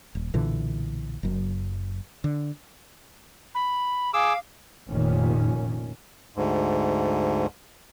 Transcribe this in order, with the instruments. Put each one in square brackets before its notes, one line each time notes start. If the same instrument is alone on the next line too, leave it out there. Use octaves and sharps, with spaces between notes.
[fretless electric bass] D#1
B1 A#2 D3 E3
F#1 F#2
D3
[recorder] B5
[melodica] G#4 D6 E6 [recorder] F5
[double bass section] F1 F2 A#2 D#3 C#4
[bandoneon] D2 G#2